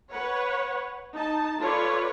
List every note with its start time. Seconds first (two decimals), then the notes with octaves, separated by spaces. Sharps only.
0.12 B4 C#5 F#5
1.14 D#4 A5
1.60 F4 A4 B4 C#5 D5